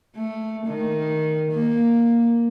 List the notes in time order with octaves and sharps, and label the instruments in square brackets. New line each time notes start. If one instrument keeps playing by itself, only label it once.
[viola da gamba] A3
D#3
A#3